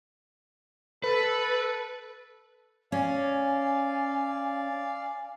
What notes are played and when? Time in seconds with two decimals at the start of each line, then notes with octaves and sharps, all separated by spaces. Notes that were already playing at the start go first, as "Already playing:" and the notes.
1.04 A4 B4
2.92 C#4 D5 F5 G#5